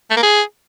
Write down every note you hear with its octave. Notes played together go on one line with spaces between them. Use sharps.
A3
A#3
G#4